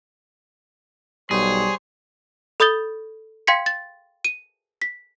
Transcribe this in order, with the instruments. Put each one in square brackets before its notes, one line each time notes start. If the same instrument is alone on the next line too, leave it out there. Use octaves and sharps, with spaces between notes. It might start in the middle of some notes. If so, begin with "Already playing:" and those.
[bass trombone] B1 [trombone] G3 [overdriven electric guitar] G#4 [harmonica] C5 C#5
[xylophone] A4 B5 D#6 G6 A6 G7
F5 G5 C6 G#6 B6 C#7
A6
D#7
B6